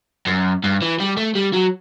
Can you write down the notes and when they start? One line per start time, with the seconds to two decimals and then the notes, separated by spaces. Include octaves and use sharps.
0.27 F#2
0.64 G2
0.82 E3
1.00 G3
1.17 A3
1.36 G3
1.53 F#3